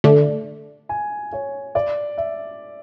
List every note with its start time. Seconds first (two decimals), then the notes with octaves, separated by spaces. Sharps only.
0.04 D3 A3 D4
0.89 G#5
1.33 C#5
1.75 D5
2.18 E5